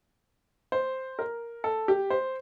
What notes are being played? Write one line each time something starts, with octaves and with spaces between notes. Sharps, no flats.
C5
A#4
A4
G4
C5